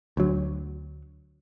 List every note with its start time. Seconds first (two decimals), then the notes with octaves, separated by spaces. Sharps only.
0.17 D2 F#3